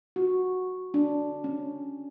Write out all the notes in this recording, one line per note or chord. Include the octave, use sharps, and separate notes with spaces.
F#4
D4
C#4